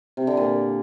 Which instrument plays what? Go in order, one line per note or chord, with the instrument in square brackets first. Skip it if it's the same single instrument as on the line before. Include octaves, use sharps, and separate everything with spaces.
[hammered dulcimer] C3
D3
A#2